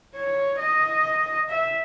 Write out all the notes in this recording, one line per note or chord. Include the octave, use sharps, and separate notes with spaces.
C#5
D#5
E5